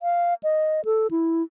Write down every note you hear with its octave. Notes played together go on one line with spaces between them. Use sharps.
F5
D#5
A4
E4